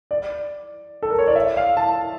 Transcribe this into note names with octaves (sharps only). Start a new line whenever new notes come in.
D5
A4
A#4
C#5
D5
E5
F5
A5